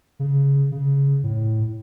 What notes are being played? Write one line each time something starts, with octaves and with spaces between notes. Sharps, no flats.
C#3
C#3
A2